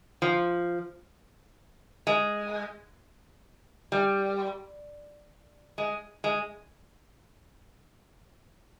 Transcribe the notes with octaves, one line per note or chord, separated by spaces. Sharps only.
F3
G#3
G3
G#3
G#3